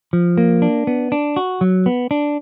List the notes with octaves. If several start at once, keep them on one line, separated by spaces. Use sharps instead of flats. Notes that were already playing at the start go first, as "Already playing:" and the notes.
F3
A#3
D4
B3
D4
F#4
F#3
B3
D4